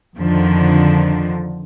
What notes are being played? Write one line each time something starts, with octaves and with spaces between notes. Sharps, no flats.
F2 D3 D#3 F3